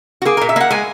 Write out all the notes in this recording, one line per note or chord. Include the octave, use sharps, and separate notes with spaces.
F#4
A#3 G#4
A#2 A#4
E5
A#3 F#5
G#3 G#5